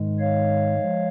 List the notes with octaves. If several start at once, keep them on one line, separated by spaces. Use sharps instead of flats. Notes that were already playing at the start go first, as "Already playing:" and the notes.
Already playing: G#2 D#3 G#3
C#5 F5
F3 G#3